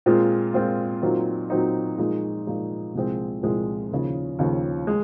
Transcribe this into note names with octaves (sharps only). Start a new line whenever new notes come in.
A#2 G#3 C4 F4
A#2 G#3 C4 F4
A#2 F#3 C4 D#4
A#2 F#3 C4 D#4
A#2 F3 G#3 D#4
A#2 F3 G#3 D#4
C2 A#2 F3 G#3 C4
C2 A#2 F3 G#3 C4
D#2 C#3 F3
D#2 C#3 F3
G#3